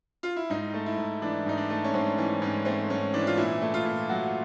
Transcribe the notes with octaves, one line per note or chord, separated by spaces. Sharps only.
F4
E4
G#2 D#4
A3
E4
G#2
E3 D4
G#2 D#4
D4
A3
C#4
G#2 C4
E3 C#4
G#2 C#4
A3 C4
G#2 C#4
E3 D4
F4
A#2 E4
A3
F4
A#2
F#3 F#4